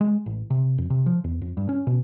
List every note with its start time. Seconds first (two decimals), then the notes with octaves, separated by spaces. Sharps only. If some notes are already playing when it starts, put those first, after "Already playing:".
0.01 G#3
0.26 A1
0.50 C3
0.78 F2
0.90 C3
1.06 F3
1.24 E2
1.42 F2
1.57 G2
1.69 C#4
1.87 B2